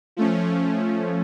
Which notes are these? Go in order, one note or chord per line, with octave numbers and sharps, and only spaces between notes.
F3 A3 C#4